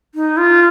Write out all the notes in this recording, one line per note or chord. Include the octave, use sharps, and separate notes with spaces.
D#4
F4